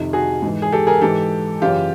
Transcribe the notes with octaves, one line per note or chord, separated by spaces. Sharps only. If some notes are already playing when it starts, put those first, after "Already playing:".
Already playing: F2 C3 D#3
F#4 G#4
G#2 E3
G#4
G4 A4
G#4 A#4
G#2 E3 G4 A4
F#2 C#3 E3 F4 G4